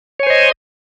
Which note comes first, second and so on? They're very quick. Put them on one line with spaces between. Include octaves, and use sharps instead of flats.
C#5 G#5 C5 D#5